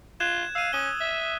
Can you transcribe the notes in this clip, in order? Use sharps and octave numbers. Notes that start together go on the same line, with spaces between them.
F4 F#6 G#6 E7
F5 E6 D#7
C#4 D#6 D#7 G7
E5